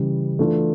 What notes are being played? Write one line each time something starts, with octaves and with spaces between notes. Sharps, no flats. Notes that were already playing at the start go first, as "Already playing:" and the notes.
Already playing: C#3 E3 G3
E3 A3 D4 F4